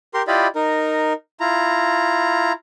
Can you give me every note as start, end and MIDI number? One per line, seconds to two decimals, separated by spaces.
0.14 0.22 67
0.14 0.22 70
0.14 0.22 84
0.27 0.47 64
0.27 0.47 65
0.27 0.47 67
0.27 0.47 74
0.27 0.47 75
0.27 0.47 83
0.55 1.13 63
0.55 1.13 70
1.40 2.52 64
1.40 2.52 65
1.40 2.52 82